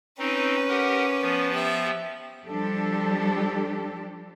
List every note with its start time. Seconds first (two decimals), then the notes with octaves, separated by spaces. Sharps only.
0.19 C4 C#4 D#4 B4
0.69 G4 A#4 F#5
1.22 F3 B3
1.53 G4 E5
2.46 F3 G3 D4 G4 A4